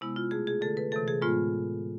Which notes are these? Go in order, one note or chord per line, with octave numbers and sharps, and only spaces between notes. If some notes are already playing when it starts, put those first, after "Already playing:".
C3 G#3 B3 E4
F4
B2 A3 G#4
G#4
D3 A3 A4
B4
C3 E3 A3 A4
G#4
A2 G#3 B3 F4